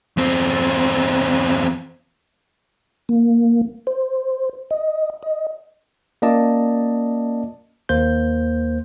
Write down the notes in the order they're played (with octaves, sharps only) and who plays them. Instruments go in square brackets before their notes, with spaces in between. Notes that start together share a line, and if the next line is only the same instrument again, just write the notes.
[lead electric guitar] E2 C4
[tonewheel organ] A#3
C5
D#5
D#5
[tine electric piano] A#3 C#4 F4 D5 D#5 A5
D#2 A#3 C5 G6